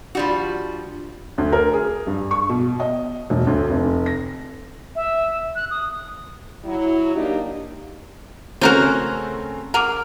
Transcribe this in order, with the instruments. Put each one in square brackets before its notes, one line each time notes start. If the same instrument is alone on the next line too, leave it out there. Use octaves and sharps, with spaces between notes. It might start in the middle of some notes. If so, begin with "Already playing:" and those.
[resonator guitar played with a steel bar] F3 G3 F#4 [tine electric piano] D4 F4
[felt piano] D2
A#4
G#4
G2
C#6
B2
D#5
E1
D2
F1
A#6
[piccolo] E5
F#6
D#6
[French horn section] F#3 E4
A#3 D4 D#4 G4
[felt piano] C#3 A3 C4 [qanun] C#4 A#5 [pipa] F#4 A#4 C5
[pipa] G#4 A#4 [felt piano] F#5 D6